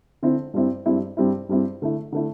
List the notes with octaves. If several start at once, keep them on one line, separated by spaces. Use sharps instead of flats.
D3 C4 E4
G2 G3 C4 E4
G2 G3 C4 E4
G2 G3 C4 E4
G2 G3 C4 E4
D3 A3 E4
D3 A3 E4